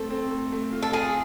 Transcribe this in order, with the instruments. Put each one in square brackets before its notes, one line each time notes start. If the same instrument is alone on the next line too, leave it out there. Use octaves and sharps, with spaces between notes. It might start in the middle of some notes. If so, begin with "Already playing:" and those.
Already playing: [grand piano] A3 C4 [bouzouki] A4
[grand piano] C4
A3
A3
F4
[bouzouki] A4
[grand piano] F4 [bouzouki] G#4